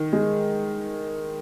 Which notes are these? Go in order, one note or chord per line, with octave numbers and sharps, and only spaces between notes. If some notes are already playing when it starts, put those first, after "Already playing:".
Already playing: D#3
G#3